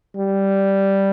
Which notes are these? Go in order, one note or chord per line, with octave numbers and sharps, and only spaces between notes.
G3